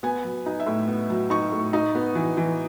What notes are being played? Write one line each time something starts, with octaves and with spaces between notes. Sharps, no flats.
B3 G#5
F#3
D#4
E5
A2
B3
F#3
D#4 C#6
A2
D#4
B3
E3
E3